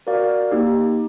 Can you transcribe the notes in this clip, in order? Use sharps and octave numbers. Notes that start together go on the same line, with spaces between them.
F#4 A#4 D5 F5
A#3 D#4 G4